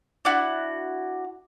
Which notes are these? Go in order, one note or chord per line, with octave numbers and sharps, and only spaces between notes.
D4 E4 F#4